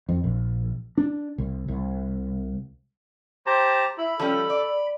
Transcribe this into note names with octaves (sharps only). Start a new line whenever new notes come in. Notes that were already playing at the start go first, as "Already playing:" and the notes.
F2
A#1
D4
C2
C2
G4 C5 A5 A#5
E4 B5
F3 G3 C#4 A4
D5